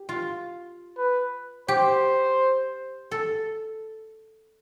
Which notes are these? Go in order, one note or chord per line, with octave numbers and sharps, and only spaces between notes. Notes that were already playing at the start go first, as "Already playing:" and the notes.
Already playing: G4
F4
B4
G4 C5
A4